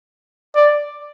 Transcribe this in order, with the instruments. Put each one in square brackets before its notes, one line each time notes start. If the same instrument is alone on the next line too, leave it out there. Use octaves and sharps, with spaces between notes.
[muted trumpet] D5